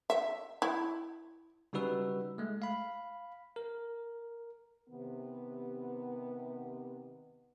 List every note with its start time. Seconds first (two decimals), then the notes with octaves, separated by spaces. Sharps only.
0.10 E5
0.62 E4
1.73 C#3 G3 D#4 F#4 B4 E6
2.38 G#3 A3
2.62 F5 B5
3.56 A#4
4.89 C3 D#3 B3